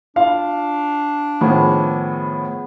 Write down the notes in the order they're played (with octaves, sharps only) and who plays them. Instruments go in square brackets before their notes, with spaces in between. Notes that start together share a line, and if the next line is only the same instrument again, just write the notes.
[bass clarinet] D4 [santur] F4 C6 [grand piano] F5
[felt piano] A2 D#3 F3 [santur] B3 G#4 B4